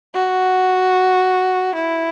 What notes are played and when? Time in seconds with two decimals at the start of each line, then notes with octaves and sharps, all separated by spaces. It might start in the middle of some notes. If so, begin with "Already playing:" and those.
0.14 F#4
1.75 E4